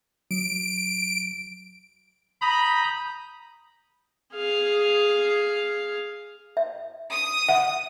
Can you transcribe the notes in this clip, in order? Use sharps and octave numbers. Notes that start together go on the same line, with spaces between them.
F#3 D7
A#5 B5 D#6 G6
G#4 F5
E5
D#6
E5 F#5